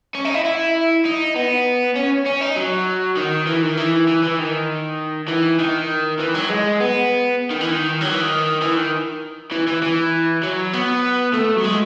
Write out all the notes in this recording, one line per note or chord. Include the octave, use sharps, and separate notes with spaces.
C#4
D#4
E4
E4
D#4
B3
C#4
C#4
D#4
F#3
D#3
E3
D#3
E3
E3
E3
D#3
E3
D#3
E3
F#3
G#3
B3
D#3
E3
D#3
F#3
E3
D#3
E3
D#3
E3
E3
E3
F#3
B3
A3
F#3
G#3